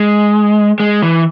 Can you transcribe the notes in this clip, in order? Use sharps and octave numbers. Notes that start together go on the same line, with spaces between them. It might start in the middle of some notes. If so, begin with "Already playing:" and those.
Already playing: G#3
G#3
E3